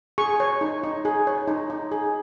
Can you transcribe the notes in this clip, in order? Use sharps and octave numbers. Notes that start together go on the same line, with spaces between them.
G#4 C#6
C#5
D#4
D#4
G#4
C#5
D#4
D#4
G#4